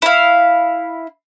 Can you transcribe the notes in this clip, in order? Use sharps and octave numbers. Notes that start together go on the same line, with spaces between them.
E4 F5